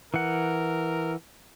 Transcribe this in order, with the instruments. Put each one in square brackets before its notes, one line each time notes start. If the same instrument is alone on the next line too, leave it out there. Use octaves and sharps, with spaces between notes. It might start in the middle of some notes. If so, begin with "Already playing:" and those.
[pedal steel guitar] E3 F#5 [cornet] A#4